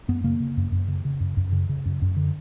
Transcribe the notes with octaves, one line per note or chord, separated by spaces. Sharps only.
F#2 B3
C#3 A#3
C#3
F#2
F#2
C#3
C#3
F#2
F#2
C#3
C#3
F#2
F#2
D3